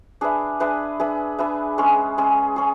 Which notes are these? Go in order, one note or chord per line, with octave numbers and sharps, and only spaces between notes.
D4 G#4 B4 E5
D4 G#4 B4 E5
D4 G#4 B4 E5
D4 G#4 B4 E5
G#3 C#4 G#4
G#3 C#4 G#4
C#4 G#4